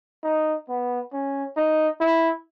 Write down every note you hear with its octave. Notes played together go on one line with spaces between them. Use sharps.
D#4
B3
C#4
D#4
E4